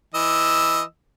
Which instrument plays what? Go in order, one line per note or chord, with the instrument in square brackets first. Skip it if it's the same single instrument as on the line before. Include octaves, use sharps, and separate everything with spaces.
[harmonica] E3 D#5 E6